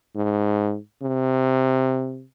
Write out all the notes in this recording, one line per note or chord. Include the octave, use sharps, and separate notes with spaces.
G#2
C3